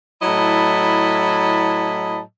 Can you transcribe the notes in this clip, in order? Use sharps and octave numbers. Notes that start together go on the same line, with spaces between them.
A2 F#3 E4 D#5 A5 B5